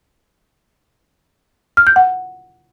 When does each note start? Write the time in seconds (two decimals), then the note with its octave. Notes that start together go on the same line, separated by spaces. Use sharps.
1.77 F6
1.87 G6
1.96 F#5